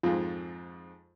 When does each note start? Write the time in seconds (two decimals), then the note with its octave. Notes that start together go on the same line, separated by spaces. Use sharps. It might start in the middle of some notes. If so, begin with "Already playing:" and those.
0.03 F2 G#2 F4